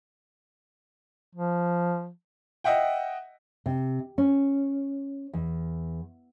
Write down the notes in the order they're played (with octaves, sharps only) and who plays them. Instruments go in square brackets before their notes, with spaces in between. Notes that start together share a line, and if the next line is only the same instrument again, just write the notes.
[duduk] F3
[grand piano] D#5 E5 F#5 G5
[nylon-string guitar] C3
C#4
E2